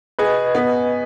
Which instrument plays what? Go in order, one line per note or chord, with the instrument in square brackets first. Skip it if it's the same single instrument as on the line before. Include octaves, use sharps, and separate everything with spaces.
[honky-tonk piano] G#4 [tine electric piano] B4 D#5
[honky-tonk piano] B3